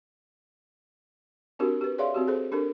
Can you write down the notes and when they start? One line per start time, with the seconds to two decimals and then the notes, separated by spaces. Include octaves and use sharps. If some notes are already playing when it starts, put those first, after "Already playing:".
1.59 C4 D4 D#4 F#4 G4 A#4
1.81 G4 B4
1.98 G#4 C#5 D5 E5 F5 C6
2.14 C4 F#4 G4
2.27 G#4 A4 C5
2.52 D4 G4 A4 A#4